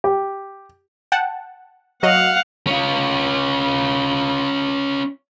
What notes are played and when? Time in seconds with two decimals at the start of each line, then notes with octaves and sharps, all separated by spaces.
0.04 G4
1.12 F#5 G5 A5
2.03 F#3 F#4 D#5 F5 F#5
2.67 C#4 F4